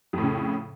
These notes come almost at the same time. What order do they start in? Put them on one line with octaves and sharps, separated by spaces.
F2 A2 C#3